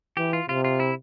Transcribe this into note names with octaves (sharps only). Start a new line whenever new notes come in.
E3 G4
F4
C3 F4
F4
E4